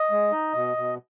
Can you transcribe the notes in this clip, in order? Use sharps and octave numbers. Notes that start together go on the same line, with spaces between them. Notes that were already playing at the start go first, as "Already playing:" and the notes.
Already playing: D#5
G#3
D#4
B2
B2